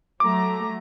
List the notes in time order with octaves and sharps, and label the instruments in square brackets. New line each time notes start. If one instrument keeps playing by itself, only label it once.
[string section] F#3 A3 A#5 [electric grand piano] D6